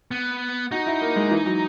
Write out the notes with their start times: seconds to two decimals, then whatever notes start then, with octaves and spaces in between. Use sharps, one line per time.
0.11 B3
0.71 D#4 F#4
0.86 E4
1.01 A#3
1.16 G#3
1.31 E3
1.46 F#3